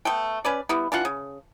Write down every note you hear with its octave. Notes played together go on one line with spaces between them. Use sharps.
A3 B3 A4 G5
C#4 B4 D5
G3 B3 E4
E3 D4 F4 F#5
C#3